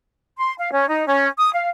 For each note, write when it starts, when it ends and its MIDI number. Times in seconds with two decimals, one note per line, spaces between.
0.37 0.53 84
0.58 0.71 77
0.71 0.86 61
0.88 1.04 63
1.05 1.26 61
1.38 1.50 87
1.52 1.68 77